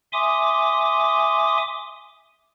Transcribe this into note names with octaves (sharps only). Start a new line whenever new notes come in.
E5 G#5 C6 D6 D#6